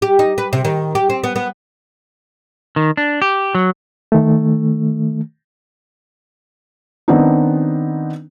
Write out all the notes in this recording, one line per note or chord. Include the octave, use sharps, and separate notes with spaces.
G4
D#4
B4
C3
D#3
G4
C4
B3
B3
D#3
D4
G4
F#3
D#3 A3
D#3 B3 C4 D4 D#4